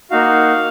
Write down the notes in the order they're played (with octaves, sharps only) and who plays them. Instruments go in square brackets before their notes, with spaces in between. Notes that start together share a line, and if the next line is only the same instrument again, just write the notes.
[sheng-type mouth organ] A#3 D#4 F#4 F5